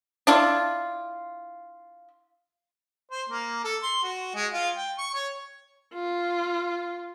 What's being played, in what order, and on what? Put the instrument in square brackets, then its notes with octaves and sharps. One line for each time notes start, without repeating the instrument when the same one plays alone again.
[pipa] D4 E4 F4
[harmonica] C5
A#3
A4
C6
F#4
G#3
F4
G5
C#6
C#5
[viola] F4